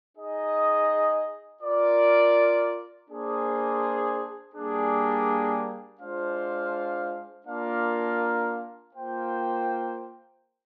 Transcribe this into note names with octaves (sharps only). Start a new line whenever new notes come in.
D#4 G#4 D#5
F4 A#4 D5
A#3 D4 G#4 C5
G3 A#3 D4 G#4
G#3 D4 F4 C5 F5
A#3 D4 F4 A#4 F5
A#3 F4 C5 G5